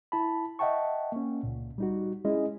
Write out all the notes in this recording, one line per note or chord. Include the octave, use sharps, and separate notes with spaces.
E4 A5 B5
D#5 E5 F#5 G5 A5 C#6
A#3 C#4
C#2 A#2
G3 D#4 F#4
G#3 C#4 E4 G#4 D#5